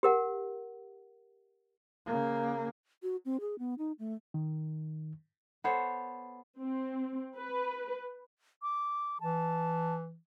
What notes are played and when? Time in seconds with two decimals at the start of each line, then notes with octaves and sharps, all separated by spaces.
0.03 G4 A#4 F#5
2.06 C#3 A#3
3.03 F#4
3.25 C4
3.40 G#4
3.59 B3
3.78 D#4
3.99 A3
4.34 D#3
5.64 B3 A4 C5 C#5
6.60 C4
7.36 B4
8.62 D6
9.21 E3 A5